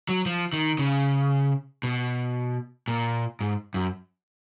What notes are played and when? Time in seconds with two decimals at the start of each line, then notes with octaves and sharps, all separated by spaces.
0.09 F#3
0.26 F3
0.53 D#3
0.78 C#3
1.83 B2
2.88 A#2
3.41 G#2
3.74 F#2